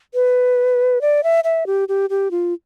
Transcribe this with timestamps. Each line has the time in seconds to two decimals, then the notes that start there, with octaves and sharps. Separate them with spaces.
0.14 B4
1.01 D5
1.24 E5
1.44 E5
1.67 G4
1.89 G4
2.10 G4
2.31 F4